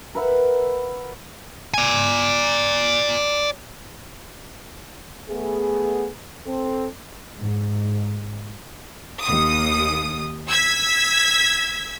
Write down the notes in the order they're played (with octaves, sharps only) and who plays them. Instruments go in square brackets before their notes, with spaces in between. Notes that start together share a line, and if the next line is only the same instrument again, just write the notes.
[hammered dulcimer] A#4 B4 E5 F#5
[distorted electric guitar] D5 G#5
[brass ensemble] A3 B3 G#4
C4 A4
[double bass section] G#2
[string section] D#2 D#6
E6 G#6 B6